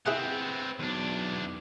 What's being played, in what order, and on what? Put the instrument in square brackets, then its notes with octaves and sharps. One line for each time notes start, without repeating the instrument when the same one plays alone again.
[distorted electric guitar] B3 C4 [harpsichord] E4 G#4 F#5
[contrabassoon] B1 [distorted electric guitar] E2 D4